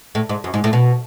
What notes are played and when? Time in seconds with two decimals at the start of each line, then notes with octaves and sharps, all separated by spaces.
0.15 A2
0.29 G#2
0.44 F#2
0.54 G#2
0.64 A2
0.73 B2